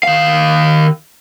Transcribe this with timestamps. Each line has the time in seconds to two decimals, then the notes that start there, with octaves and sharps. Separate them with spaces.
0.03 D#3 F5